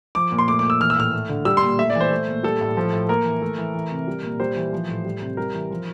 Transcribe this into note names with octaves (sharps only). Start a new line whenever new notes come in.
F3 D6
A#2
C6
A3 D6
A#2 D6
E6
E3 F6
E6
A2 F6
A3
D3
G3 E6
C6
A#2
A3 E5
D5
E3 C5
A3
A#2
G3 A4
A2
F3
A2
A#3 A#4
E3
A3
E3
E3
C3
G3
A#2
G3 C5
E3
F3
A2
G3
C3
G3 A#4
E3
F3